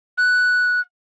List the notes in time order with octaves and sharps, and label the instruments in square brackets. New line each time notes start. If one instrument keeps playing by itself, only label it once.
[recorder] F#6